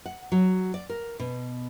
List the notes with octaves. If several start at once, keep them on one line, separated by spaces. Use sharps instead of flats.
F#5
F#3
D5
A#4
B2